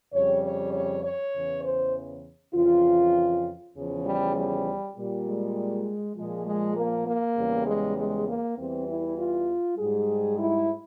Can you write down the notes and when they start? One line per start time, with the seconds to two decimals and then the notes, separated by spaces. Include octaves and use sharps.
0.14 F2 C#3 G3 C#5
0.44 C#5
0.73 C#5
1.04 C#5
1.34 E2 C#3 E3
1.64 C5
2.54 F2 C#3 E3 F4
3.75 E2 C#3 F3
4.05 G3
4.36 G3
4.96 A#2 G3
5.26 G#3
6.16 A#2 F3 G#3
6.46 G#3
6.76 A#3
7.07 A#3
7.37 E2 C#3 G3
7.66 G#3
7.97 G#3
8.27 A#3
8.57 E2 E3 G3 C4
8.87 E4
9.18 F4
9.77 G#2 G3 G#4
10.38 E4